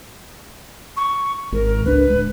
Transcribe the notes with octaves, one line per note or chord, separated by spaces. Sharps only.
C#6
G#1 G#2 A#4
C#2 C4 D4 B4
D1 G#3